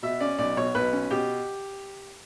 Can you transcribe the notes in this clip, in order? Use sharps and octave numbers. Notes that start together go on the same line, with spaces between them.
B2 E5
C#4 D5
B1 D5
B2 C#5
B1 B4
C#4
B2 G4